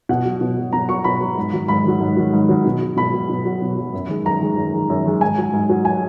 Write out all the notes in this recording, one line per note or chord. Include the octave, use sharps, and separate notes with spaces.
B2 F#5
F#3
B2
F#3
B2 A#5
F#3 C#6
B2 B5
F#3
G#2
D#3 F#3
G#2 B5
D#3 F#3
G#2
D#3 F#3
G#2
D#3 F#3
B2
F#3
B2 B5
F#3
B2
F#3
B2
F#3
F#2
D#3 G#3
F#2 A#5
D#3 G#3
F#2
D#3 G#3
F#2
D#3 G#3
G#2 G#5
F#3
G#2
F#3
G#5